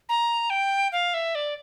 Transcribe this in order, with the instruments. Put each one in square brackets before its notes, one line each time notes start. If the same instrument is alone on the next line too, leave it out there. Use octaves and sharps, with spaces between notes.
[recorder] A#5
G5
F5
E5
D5